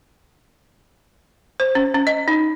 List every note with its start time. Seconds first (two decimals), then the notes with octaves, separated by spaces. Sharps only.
1.60 C5
1.75 C#4
1.94 C#4
2.07 D#5
2.28 D#4